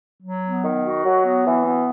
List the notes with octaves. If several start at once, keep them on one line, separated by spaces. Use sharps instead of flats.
F#3
B3
D#3
F#4
F#3
B3
E3
B3